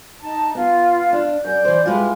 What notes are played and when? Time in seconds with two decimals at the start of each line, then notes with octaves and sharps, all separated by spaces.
0.21 D#4 A5
0.55 B3 F4
1.13 D4
1.45 F#2 D5 G6
1.65 E3 C5
1.86 G#3 E4 F4 G4 B4